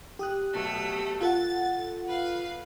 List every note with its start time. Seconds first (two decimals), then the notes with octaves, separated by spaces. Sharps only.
0.19 G4 D#6 F#6
0.53 B2 F#3 A3
1.21 F4 A4 F#5 A6
2.08 B4 F5